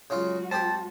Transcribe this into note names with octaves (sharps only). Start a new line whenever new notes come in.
C#3 F#3 G#3 F4 F#4
C4 G4 A5